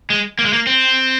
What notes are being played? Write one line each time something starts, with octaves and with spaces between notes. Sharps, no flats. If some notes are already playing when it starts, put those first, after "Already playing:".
G#3
A#3
G#3
A#3
C4